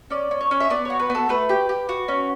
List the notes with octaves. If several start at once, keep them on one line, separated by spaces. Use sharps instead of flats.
C#4 D5
C#4
C#5
C#4
E5
B3 D5
F#4 C#5
B4
B3 A4
A3 B4
G4
G4
F#4
C#4